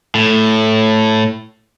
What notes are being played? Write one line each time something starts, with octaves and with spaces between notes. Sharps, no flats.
A2